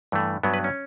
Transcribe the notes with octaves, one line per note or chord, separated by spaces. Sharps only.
G2 E3 A3
G2 F#3 B3
B4
C#4